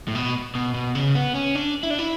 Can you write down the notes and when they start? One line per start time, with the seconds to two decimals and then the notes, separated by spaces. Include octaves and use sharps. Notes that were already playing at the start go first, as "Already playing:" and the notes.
0.08 A2
0.15 B2
0.55 B2
0.74 B2
0.95 C#3
1.15 B3
1.35 C#4
1.55 D4
1.83 E4
1.90 D4
1.99 E4